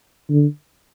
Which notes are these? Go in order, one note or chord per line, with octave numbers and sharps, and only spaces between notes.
D3